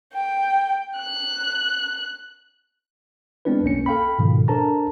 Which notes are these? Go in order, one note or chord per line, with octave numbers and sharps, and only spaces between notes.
G5
F#6
G#3 B3 C4 D4 E4 B4
B1 A#3 C#4 C#7
A4 F5 G5 B5
G#2 B2 D#3 F3
D4 A4 A#4 C5 A5 A#5